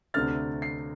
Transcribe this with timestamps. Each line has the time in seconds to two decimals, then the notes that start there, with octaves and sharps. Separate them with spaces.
0.14 D2 C3 A3 D4 F6 A6
0.62 C7